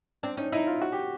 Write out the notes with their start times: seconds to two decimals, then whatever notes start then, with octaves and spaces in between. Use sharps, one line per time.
0.23 C4 D4
0.37 C#4 D#4
0.52 D#4 E4
0.67 F4
0.82 F#4
0.92 G4